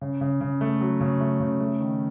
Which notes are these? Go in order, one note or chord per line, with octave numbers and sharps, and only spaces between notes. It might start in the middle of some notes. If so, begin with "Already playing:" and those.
C#3
C#3
C#3
A3
F#3
C#3
A3
C#3
A3
D#3